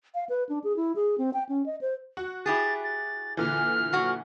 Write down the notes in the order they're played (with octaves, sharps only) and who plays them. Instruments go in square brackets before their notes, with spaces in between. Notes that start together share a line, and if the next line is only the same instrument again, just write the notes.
[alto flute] F5
B4
D4
G#4
E4
G#4
C4
G5
C#4
D#5
C5
[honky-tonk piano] F#4
[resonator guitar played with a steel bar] E4 G4 G#4 [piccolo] A6
[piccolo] A6
[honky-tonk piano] A#2 D3 E3 [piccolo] F6
[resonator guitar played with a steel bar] F#3 F#4